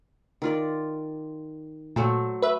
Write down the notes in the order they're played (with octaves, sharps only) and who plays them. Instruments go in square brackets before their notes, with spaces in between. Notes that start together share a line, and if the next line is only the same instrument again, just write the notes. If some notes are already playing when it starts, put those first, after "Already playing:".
[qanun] D#3 F4 D5
[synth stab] A#2 [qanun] F#3 A3 C5
[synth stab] B4 E5